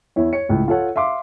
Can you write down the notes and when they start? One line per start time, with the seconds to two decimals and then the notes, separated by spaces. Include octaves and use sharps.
0.16 E2 E4 C#5
0.33 C#5 C#7
0.49 C#2 A2
0.68 F4 A4 C#5 F#5
0.96 E5 F5 C6 D6